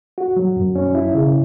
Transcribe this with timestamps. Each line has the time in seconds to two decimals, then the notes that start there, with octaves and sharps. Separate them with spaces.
0.18 F#4
0.37 F#3
0.56 F#2
0.76 C#4
0.95 E4
1.15 C#3